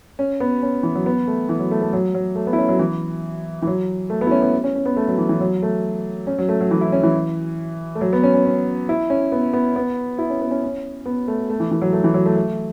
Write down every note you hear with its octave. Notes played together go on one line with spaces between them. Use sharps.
C#4
B3
C#4
E3
F#3
B3
A3
E3
F#3
A3
A3
F#3
F#3
A3
B3
E4
C#4
F#3
E3
E3
F#3
A3
B3
E4
C#4
B3
C#4
C#4
B3
A3
F#3
E3
E3
F#3
A3
C#4
F#3
A3
F#3
E3
E4
C#4
E3
A3
F#3
B3
C#4
C#4
C#4
E4
C#4
B3
B3
B3
E4
C#4
B3
C#4
C#4
B3
A3
A3
E3
E3
F#3
A3
E3
F#3
A3
A3